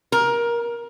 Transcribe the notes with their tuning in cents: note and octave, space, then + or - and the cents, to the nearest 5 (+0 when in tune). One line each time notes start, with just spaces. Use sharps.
A#4 +20